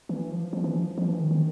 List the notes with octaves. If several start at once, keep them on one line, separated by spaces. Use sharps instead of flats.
E3
F3
F3
E3
F3
F3
E3
D#3
D#3